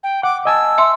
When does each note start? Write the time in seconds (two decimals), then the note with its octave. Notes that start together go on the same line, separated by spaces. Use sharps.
0.03 G5
0.23 F#5 D6
0.45 D#5 G#5 A5 E6
0.78 E5 C6